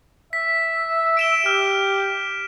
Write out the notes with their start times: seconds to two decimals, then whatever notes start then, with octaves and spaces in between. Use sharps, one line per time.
0.33 E5 B6
1.17 D7 E7 G7
1.46 G4 F6